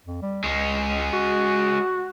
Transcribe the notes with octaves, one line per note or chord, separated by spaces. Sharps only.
F2
G3
C#2 G#3 C#4
F#4